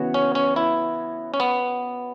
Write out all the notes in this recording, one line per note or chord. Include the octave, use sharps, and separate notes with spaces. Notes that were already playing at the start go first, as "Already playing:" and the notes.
Already playing: C#3 E3 B3 F#4 C#5
C#4
C#4
E4
C#4
B3